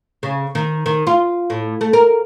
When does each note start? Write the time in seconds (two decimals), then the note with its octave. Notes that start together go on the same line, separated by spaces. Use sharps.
0.23 C#3
0.55 D#3
0.86 D#3
1.07 F4
1.50 A2
1.81 A3
1.93 A#4